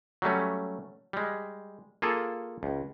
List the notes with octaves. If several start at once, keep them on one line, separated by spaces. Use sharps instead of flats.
F#3 G3 A3 C#4
G3 G#3
A#3 F4 G#4 A4
C#2